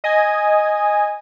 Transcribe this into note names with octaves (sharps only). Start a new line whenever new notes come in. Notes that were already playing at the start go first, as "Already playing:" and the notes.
D#5 G#5